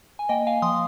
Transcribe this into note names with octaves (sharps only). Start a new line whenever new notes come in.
G#5
A#3 D#5 G5
F5 G#5
F3 C6 D#6